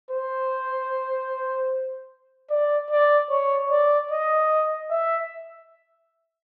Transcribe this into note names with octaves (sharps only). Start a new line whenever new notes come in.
C5
D5
D5
C#5
D5
D#5
E5